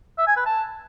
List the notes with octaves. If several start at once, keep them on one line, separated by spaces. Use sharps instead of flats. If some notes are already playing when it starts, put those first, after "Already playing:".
E5
G#5
B4
A5